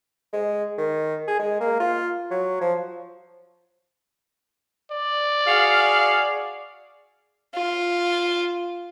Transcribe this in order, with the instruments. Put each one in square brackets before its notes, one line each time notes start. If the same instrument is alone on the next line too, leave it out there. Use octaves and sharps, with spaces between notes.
[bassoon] G#3
D#3
G#4
G#3
A#3
F4
F#3
F3
[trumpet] D5
[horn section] F#4 G#4 F5
[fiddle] F4